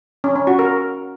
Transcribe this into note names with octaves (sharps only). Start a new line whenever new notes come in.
C#4
C#4
F#4
A#4